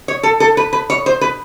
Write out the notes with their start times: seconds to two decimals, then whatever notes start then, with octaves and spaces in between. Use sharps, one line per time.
0.08 C#5
0.23 A4
0.40 A4
0.57 B4
0.73 B4
0.90 C#5
1.06 C5
1.21 B4